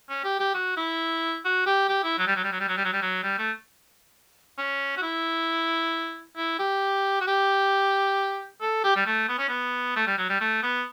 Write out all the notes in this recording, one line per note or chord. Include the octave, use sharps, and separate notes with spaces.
C#4
G4
G4
F#4
E4
F#4
G4
G4
E4
F#3
G3
F#3
G3
F#3
G3
F#3
G3
F#3
G3
F#3
G3
A3
C#4
F#4
E4
E4
G4
F#4
G4
A4
G4
G3
A3
B3
C#4
B3
A3
G3
F#3
G3
A3
B3